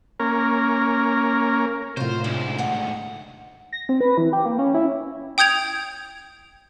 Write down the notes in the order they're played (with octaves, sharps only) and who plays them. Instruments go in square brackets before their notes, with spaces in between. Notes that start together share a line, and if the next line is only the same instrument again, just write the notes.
[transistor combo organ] A#3 C#4 A#4
[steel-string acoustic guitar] F#2 F4 [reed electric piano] A2 C3 [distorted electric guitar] C5
[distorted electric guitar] D2 G#2 [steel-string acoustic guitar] E4
[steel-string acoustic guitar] D#3 F#5
[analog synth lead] A#6
C4
B4
E3
G4
A#3
C#4
E4
[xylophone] G5 D#6 G6 G#6 F7